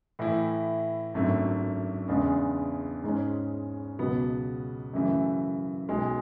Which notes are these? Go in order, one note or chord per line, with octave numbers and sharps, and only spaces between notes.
A2 E3 A3 E4
G#1 F#2 D3 A3
E2 C#3 G#3 D4
G#2 G#3 C#4
C#2 B2 F#3 B3
F#2 C#3 E3 A3
B1 B2 G#3